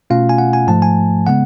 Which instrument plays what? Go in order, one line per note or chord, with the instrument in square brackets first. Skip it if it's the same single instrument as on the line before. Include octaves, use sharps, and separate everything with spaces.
[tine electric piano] B2 A3 C#4 F4 F5
G#5
F#5
G#5
G#2 F3 A3 A5
G#5
C#3 G#3 B3 F#5